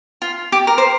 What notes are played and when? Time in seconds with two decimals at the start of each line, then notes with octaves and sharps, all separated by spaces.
0.22 F4
0.52 G4
0.67 A#4
0.78 C5